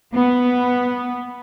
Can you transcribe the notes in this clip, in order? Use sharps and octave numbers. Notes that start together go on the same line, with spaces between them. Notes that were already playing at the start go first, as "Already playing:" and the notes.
B3